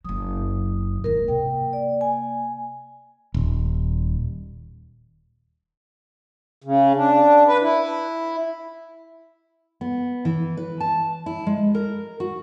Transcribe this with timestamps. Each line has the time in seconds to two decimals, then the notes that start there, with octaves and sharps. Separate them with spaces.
0.05 F#1 F#3 D#6
1.04 D#2 G#2 A#4
1.28 C3 A#3 G5
1.73 D5
2.01 G#5
3.34 D#1
6.64 C#3
6.96 D4
7.46 B4
7.62 E4
9.81 B3
10.25 E3
10.57 B4
10.80 A5
11.26 E4
11.47 G#3
11.75 A#4
12.20 F#4